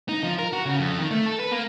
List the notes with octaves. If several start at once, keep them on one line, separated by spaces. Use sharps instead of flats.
D#4
F3
A#4
F#4
C#3
F2
D#3
A3
A4
B4
A#3